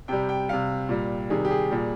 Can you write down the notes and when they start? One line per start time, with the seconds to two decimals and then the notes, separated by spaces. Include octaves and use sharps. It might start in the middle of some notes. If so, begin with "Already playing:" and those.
0.08 C3 G3 G5
0.29 G5
0.49 C3 G3 F5
0.89 A#2 G3
1.30 C3 D#3 G3 G#4
1.45 G4
1.51 G#4
1.71 A#2 G3